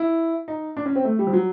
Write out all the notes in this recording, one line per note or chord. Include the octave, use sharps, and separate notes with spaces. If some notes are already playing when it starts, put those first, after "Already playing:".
Already playing: E4
D#4
D4
C#4
C4
A3
G3
F3
F#3